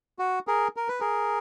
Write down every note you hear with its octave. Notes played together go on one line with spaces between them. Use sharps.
F#4
G#4 A#4
A#4
B4
G#4 A#4